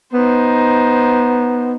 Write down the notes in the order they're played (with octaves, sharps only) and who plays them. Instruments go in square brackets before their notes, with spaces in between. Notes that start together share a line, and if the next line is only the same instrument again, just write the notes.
[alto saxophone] B3 [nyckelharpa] D#4 C5